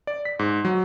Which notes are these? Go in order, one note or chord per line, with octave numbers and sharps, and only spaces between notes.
D5
B6
G#2
F#3